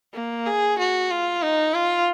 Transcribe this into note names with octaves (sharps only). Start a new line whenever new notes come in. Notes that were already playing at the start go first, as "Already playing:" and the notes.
A#3
G#4
F#4
F4
D#4
F4